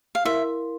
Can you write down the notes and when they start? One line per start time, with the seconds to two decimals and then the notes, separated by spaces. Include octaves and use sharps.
0.15 F5
0.25 E4 A#4 E5 F5 C6